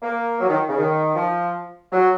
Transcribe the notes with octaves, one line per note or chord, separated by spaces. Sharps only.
A#3
F#3
D#3
C#3
D#3
F3
F#3